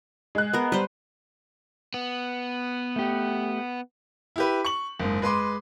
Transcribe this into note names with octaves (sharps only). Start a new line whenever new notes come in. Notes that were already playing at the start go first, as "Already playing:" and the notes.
G#3 F#6
B3 A#4
G3 B4 C5
B3
A3 G4
E4 G4 B4
C#6 F#7
F#1 G#2
G#3 B4 C6 D6